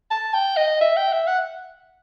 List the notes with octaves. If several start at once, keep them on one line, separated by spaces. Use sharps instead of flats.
A5
G5
D#5
E5
G5
E5
F#5